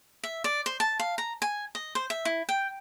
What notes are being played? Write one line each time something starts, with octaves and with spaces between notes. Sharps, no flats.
E5
D5
C5
A5
F5
A#5
G#5
D#5
C5
E5
E4
G5